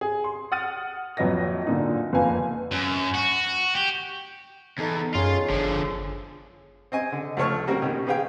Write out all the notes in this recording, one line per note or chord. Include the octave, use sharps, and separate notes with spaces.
G#4
C6
F#5 D#6 F6 A6 D#7
A#1 F2 F#3 B4 D#5 A#6
A#2 D3 D#4
F#1 F2 B3 B4 F5 G#5
F#2
F#4
G4
E2 D#4 A4
F#2 F4 G#4 C#5
G1 D3 F3
C4 D#5 G#5
D3
C#2 F3 A3 C#5 C#6 F6
G3 A#3 C4 F#4
B2 D#3 C#4 D#4
B3 G4 G#4 F5 G5